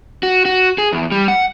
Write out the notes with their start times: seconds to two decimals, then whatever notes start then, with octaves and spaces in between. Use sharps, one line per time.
0.23 F#4
0.45 F#4
0.78 G#4
0.93 E2
1.12 G3
1.28 F#5